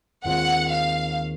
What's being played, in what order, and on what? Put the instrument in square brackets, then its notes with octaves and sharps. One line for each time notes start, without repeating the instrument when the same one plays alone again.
[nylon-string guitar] D#2 D#3 G#3 C4 F4 [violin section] F#5
[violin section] F5